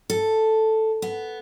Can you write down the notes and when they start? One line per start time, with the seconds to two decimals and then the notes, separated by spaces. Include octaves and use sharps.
0.10 A4
1.02 B3